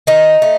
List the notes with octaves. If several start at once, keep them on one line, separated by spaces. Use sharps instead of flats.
D#3 D#4
A3